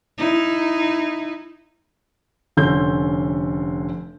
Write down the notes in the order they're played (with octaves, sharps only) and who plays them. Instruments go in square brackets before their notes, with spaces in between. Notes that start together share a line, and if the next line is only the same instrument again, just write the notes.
[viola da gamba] D#4 E4
[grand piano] F1 D3 C#4 A4 C6 G6